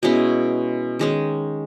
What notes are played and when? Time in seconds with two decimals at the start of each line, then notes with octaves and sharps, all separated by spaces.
0.03 B2 G#3 C#4 E4
0.99 D#3 G#3 C#4